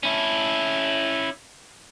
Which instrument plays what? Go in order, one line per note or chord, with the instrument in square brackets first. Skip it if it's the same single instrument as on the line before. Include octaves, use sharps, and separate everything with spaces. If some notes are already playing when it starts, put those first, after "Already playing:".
[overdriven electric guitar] C#4 E4